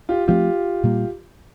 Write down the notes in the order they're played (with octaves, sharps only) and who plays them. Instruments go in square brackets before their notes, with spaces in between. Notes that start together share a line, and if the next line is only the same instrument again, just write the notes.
[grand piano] F4 G4
[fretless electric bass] F3 A3 C4 [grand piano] F4 G4
[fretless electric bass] A#2 G3 A#3